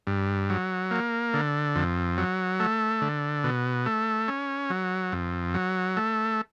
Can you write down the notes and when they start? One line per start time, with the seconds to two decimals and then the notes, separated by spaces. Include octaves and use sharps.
0.07 G2
0.50 F#3
0.91 A#3
1.34 D3
1.76 F2
2.18 F#3
2.60 A3
3.02 D3
3.44 B2
3.86 A3
4.28 C#4
4.70 F#3
5.12 F2
5.54 F#3
5.97 A3